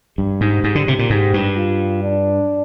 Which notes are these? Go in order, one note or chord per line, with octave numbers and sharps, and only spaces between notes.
G2 G4
G#2
G#2
D3
C3
A#2
G#2 G4
G2
F4
D4